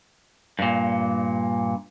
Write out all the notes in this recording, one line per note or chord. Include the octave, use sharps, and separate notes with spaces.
G2 A#2